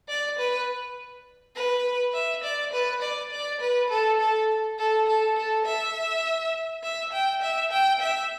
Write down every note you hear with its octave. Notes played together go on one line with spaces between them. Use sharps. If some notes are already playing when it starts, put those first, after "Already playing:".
D5
B4
B4
E5
D5
B4
D5
D5
B4
A4
A4
A4
A4
A4
E5
E5
G5
E5
G5
E5